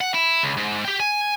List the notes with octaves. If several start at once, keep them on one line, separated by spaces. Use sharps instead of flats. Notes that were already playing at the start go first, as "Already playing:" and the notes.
F#5
E4
C#2
G#2
G4 G5
G#5